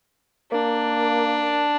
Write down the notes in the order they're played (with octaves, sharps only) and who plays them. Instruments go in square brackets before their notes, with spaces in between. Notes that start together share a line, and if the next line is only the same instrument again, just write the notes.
[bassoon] A#3 [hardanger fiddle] D4